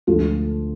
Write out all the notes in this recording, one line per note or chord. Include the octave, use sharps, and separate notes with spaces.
D2 D3 F3 F4 A4